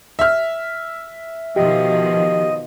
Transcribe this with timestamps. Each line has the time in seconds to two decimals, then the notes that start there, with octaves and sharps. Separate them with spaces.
0.19 E5 F6
1.56 B2 D#3 F3 G4 D#5